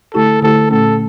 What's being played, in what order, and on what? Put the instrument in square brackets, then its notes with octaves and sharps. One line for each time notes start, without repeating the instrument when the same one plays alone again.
[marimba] D3 A3 E4 G4 [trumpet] A4
[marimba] D3 A3 E4 G4 [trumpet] A4
[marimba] A#2 A3 C#4 [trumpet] A4